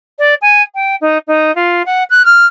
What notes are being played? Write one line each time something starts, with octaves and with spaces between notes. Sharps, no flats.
D5
G#5
G5
D#4
D#4
F4
F#5
F#6
F6